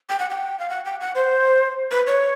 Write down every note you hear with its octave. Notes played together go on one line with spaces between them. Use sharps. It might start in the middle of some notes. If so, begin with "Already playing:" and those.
G5
F#5
G5
F5
F#5
G5
F#5
C5
B4
C#5